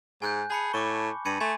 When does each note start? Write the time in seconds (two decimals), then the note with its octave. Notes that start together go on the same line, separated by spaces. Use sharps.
0.22 G#2 G#5 F#6 G6
0.50 G#4 A5 B5 C#7
0.73 A2 C#6 D6
1.25 G2 G#6 C#7 D#7
1.40 A3 G#5 C6 G#6